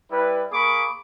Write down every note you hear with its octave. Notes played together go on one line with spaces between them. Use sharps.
G3 E4 B4
A#3 G#4 B5 C#6 D6